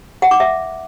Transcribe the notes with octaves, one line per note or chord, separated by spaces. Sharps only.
F#5
D6
E5